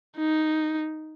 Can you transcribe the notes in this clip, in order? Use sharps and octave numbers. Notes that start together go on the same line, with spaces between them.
D#4